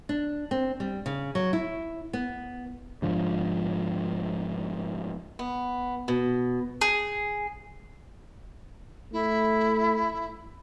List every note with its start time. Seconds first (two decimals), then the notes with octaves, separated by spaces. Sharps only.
0.09 D4
0.51 C4
0.80 G3
1.06 C#3
1.35 F#3
1.53 E4
2.13 B3
3.02 G#2 D3 F3
5.39 B3
6.08 B2
6.81 G#4
9.13 A3 E4